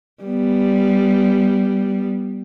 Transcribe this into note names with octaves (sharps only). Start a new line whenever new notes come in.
G3 B3